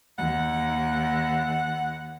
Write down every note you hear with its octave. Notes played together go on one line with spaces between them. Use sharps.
D#2 F#5